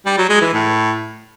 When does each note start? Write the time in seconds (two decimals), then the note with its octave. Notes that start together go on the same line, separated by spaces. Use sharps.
0.06 G3
0.18 F#3
0.29 G#3
0.41 E3
0.53 A2